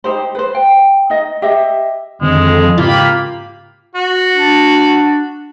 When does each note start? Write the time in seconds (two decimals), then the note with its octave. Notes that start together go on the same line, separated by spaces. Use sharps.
0.04 D#4 G4 C5
0.35 B4 C5
0.55 G5
1.10 D#4 D#5
1.42 G4 D#5 E5
2.21 F2 D3 D#3 G#3 C4
2.78 G#2 C#3 A#3 F4 G4 B5
3.95 F#4
4.33 D4